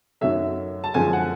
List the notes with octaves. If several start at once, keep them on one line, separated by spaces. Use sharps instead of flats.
F#2 D#3 F#3 A3 E5
A5
F#2 D3 F3 G#3 G#5
F#5